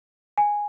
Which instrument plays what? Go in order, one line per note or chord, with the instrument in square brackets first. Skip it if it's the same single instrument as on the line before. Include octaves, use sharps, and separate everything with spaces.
[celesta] G#5